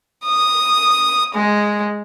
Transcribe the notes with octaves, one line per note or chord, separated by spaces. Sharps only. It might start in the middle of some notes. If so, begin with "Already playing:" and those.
D#6
G#3